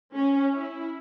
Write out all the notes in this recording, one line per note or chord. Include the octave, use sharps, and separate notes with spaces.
C#4
E4